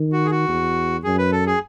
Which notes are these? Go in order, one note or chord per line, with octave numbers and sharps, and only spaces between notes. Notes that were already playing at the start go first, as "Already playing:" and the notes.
Already playing: D#3
F#4
G#4
F#4
E2
F#2 G#4
B4
A4
G#4